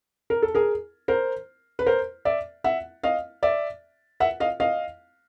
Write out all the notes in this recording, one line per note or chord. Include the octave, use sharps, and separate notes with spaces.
A#4
A4
G#4 A#4
A#4 C5
B4
A#4 C5
D5 E5
E5 F#5
D#5 F5
D5 E5
E5 F#5
D#5 F5
D#5 F5